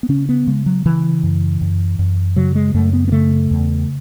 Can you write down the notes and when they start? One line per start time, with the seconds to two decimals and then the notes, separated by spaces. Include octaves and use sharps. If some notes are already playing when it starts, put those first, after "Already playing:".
0.03 B3
0.09 C#3 C#4
0.29 B3
0.47 C#3 G#3
0.66 F#3
0.86 C#3 E3
1.23 F#2
1.61 F#2
1.99 F#2
2.36 C#3 F#3
2.55 G#3
2.74 F#2 A3
2.93 B3
3.08 B3
3.12 C#3 A3
3.51 E2